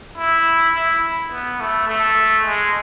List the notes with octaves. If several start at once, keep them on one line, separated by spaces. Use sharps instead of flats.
E4
E4
B3
A3
A3
G#3